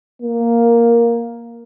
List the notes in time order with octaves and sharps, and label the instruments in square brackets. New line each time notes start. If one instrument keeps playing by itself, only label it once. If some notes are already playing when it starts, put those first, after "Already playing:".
[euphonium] A#3